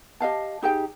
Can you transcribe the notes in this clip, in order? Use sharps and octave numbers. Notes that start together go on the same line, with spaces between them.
G4 D#5 F5 A5
D#4 G4 G#4 G5